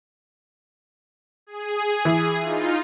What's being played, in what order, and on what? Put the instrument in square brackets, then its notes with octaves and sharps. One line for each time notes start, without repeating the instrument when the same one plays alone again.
[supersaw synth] G#4
[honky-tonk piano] E3
[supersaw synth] D#4 F4